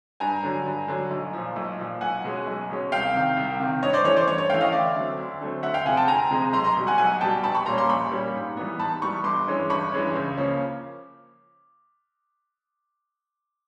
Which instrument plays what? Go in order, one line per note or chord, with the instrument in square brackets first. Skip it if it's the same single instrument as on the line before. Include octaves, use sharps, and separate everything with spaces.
[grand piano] G2 G#5 A#5
D3 F#3
G2
D3 F#3
B1
A#2 F3
B1
A#2 F3
B1 F#5 G#5
B2 G#3 C#4
B1
B2 G#3 C#4
C2 F5 G5
C3 D#3
C2
C3 D#3
G2 C#5 D#5
C5 D5
E3 A3 C#4 C#5
C5 D5
G2 C#5
C#5
E3 A3 C#4 F5 G5
D#5 F5
D2 D5 E5
D3 F#3 A3 C4
D2
D3 F#3 A3 C4
D2 E5 F#5
F5 G5
C3 F3 G#3 F#5 G#5
G5 A5
D2 G#5 A#5
C3 F3 G#3
B1 A#5 C6
A#5 C6
B2 G3
F#5 G#5
B1 F#5 G#5
B2 G3 G5 A5
A#1 A5 B5
B5 C#6
A#2 G3 A#3 C#4 A#5 C6
C6 D6
A#1 B5 C#6
A#2 G3 A#3 C#4
G#2
E3 G3 B3
G#2 A5 B5
E3 G3 B3 B5 C#6
G1 C6 D6
G2 E3 G#3 C#4
G1 B5 C#6
G2 E3 G#3 C#4
C#2
C#3 F3 A#3 C#4